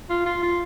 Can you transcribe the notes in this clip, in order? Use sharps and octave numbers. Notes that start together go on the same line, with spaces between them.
F4
F4
F4